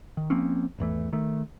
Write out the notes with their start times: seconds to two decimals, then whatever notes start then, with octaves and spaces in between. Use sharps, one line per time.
0.17 D#3
0.30 F3 A#3 C4 C#4
0.78 G#1 E2 E3 A3
1.13 D#3 A3